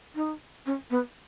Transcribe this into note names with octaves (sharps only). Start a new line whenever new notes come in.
D#4
C#4
B3